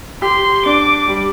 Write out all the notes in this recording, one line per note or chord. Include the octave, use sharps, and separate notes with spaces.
G4 C6
D4 D6
G3